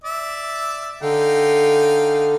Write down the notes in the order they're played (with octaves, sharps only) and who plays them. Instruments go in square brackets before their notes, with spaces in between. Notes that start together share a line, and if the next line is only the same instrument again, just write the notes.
[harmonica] D5 E5
[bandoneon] D3 [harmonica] D#4 F5 G5